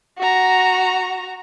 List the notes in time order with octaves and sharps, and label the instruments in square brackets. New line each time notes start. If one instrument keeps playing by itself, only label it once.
[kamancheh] F#4 A#5